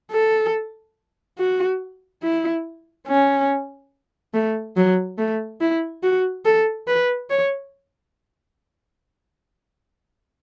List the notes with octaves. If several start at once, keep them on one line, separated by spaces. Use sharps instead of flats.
A4
F#4
E4
C#4
A3
F#3
A3
E4
F#4
A4
B4
C#5